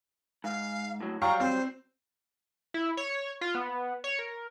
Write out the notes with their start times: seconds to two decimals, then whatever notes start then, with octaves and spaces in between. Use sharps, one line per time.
0.44 G#2 F5
1.01 A2 F#3
1.22 F#3 G3 F5 G5 A#5 C#6
1.40 C4 C5
2.74 E4
2.97 C#5
3.41 F4
3.55 B3
4.04 C#5
4.19 A#4